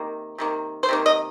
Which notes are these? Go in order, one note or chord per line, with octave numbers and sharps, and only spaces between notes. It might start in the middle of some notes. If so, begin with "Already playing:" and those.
Already playing: C3 D#3 A#3
C3 D#3 A#3
C5
C3 D#3 A#3
D#5